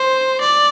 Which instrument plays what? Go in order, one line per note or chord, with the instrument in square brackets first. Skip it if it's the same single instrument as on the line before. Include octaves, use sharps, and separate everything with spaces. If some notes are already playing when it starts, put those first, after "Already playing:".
Already playing: [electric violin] C5
D5